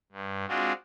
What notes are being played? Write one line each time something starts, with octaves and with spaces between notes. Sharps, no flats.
G2
G#3 C4 D4 F4 F#4